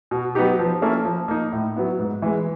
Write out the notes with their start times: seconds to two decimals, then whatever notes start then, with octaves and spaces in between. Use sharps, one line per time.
0.11 B2
0.35 F#3 B3 D#4 G4
0.59 F3
0.82 A#3 C#4 E4 A4
1.05 F3
1.28 A#3 D#4
1.52 A2
1.76 F#3 B3 E4
1.99 G#2
2.22 E3 G#3